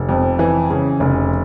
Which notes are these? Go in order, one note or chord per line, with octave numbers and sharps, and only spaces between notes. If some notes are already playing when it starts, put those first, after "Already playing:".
Already playing: F1
F2
E3
C#3
F1